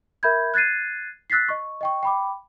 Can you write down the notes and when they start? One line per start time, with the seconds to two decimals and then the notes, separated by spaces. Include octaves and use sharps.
0.23 A#4 E5 B5 G6 G#6
0.54 F#6 G#6 A6 C7 D#7
1.30 E6 F#6 A6 B6 C7
1.49 D#5 C#6
1.81 D#5 G5 C#6
2.03 G5 B5 D6